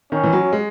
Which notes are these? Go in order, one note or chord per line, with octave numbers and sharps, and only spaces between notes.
D#3 C#4
E3
F#3
G#3